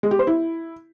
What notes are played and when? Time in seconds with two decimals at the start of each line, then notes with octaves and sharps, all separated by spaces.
0.03 G#3
0.11 G4
0.19 C5
0.27 E4